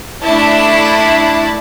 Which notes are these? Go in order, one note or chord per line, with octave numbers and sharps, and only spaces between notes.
A3 D4 E4 A5